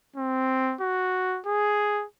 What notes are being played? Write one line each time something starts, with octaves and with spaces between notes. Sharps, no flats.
C4
F#4
G#4